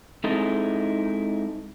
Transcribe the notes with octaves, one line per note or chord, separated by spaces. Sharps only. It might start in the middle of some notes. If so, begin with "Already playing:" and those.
G#3 C4 D#4 E4 G#4 A4